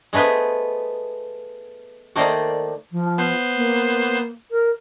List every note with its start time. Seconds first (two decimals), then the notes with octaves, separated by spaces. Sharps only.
0.13 G#3 A3 B3 B4 C5
2.16 D#3 A3 A#3 C5 D5
2.91 F3
3.18 B3 C5
3.55 A#3
4.51 A#4